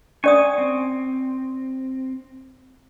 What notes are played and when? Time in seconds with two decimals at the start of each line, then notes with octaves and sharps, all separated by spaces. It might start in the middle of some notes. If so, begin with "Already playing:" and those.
0.24 C#4 D5 G#5 C#6 D#6
0.58 C4